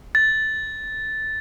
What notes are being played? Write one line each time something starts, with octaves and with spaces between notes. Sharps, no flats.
A6